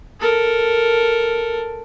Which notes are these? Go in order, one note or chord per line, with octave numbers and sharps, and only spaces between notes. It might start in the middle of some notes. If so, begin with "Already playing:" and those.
A4 A#4